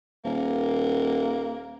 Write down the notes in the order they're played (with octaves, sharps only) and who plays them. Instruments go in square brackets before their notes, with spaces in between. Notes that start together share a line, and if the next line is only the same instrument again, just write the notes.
[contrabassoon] D#1 [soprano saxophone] A#3